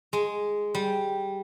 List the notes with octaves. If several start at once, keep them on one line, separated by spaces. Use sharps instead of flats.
G#3
G3